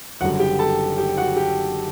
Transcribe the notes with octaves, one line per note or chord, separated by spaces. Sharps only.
F#1 F#2 D3 G3 F#4 F#5
G4 G5
A4 A5
G4 G5
F#4 F#5
G4 G5